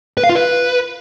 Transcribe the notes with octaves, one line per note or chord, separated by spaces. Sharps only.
B4
F5
F4
B4